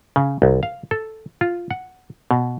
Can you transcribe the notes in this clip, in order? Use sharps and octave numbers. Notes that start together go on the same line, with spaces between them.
C#3
C2
F5
A4
F4
F#5
B2